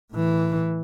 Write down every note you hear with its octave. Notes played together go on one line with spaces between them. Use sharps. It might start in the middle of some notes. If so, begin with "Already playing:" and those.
A2 E3